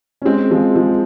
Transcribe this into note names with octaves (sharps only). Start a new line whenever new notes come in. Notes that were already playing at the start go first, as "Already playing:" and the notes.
C#4
G#3 C4
F3 G#3
F3 G#3